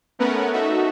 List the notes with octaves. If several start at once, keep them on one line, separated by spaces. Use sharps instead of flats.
A3 B3 C#4 A#4 B4 F#5
D#4 F#4 A4 E5